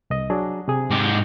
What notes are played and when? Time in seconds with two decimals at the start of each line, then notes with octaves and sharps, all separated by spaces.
0.10 C2 D#5
0.30 F#3 D4 G#4
0.68 C3 G#4
0.90 G#2 G4